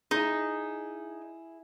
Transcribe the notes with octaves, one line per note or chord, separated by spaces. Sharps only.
D#4 E4 G#4